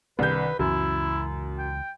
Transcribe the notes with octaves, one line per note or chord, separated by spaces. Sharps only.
C2 D#3 D4 B4 G6
C#2 F#2 E3 E4
G5